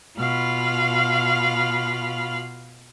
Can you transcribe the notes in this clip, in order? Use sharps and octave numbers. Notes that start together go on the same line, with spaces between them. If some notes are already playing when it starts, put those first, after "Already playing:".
B2 F4 F5 B5 F6